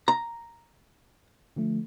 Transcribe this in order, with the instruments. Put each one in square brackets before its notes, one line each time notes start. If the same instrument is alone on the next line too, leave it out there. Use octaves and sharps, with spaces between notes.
[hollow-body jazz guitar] A#5
[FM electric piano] D3 F3 A3